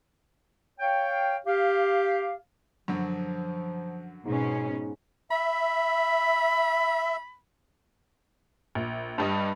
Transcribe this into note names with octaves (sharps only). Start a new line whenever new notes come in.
C#5 F5 G5
G4 F5
F#2 D3 F3 F#3
G#2 B2 C#4
E5 B5
A#1
G2 G3 D#5